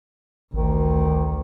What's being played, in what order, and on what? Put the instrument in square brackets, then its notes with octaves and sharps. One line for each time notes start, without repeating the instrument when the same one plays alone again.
[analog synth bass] A1 [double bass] D2 [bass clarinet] D#3